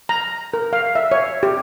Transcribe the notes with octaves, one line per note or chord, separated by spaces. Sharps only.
A#5
A#4
F5
E5
C#5
G4